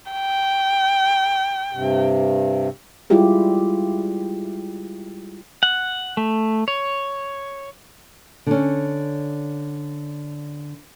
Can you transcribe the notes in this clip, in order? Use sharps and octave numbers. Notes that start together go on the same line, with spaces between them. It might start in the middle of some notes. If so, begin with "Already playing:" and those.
G5
G2 C3
G3 G#3 E4 F4 G4 G#4
F#5
A3
C#5
D3 C#4